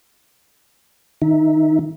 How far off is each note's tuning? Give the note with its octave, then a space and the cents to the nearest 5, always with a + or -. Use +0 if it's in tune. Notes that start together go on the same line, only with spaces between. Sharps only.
D#3 +0 D#4 +0 E5 -15